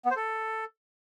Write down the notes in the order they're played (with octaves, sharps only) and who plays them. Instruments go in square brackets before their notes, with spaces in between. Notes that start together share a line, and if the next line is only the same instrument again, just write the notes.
[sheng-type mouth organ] B3
C5
A4